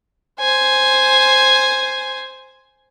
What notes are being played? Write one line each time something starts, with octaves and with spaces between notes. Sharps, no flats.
C5 G#5